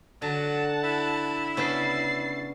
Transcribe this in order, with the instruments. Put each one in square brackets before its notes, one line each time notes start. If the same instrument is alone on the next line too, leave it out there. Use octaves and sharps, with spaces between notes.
[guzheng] D3 [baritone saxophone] F#3 [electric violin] F#5 A5
[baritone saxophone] E4
[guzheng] C#3 B3 D4 [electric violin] A6 C7